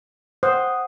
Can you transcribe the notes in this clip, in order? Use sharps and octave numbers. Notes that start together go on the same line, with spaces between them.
C5 F#5 D#6 F#6